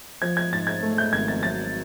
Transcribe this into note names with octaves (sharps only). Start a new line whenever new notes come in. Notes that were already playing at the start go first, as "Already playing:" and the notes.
F3 G#6
G#6
G#2 A6
G#6
A3
G6
G#1 G#6
A6
F#3 A6